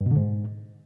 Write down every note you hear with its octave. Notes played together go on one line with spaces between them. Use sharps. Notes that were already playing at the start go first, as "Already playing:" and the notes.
G2
B2
D3
G#2